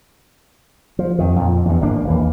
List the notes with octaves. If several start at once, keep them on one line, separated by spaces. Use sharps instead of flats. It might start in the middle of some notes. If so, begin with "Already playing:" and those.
F3
F2 D#3
F2 A#2
E2 G2
G#1 A2 A#3 D4
D#2 E3 A#3